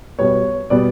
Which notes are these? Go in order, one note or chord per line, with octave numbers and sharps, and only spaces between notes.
B2 G3 B3 C#5
B2 G3 B3 D5